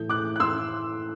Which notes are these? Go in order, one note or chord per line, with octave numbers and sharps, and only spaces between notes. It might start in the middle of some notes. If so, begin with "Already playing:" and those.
Already playing: A2 E3 A3 G6
D6 F#6
F#6
C6 E6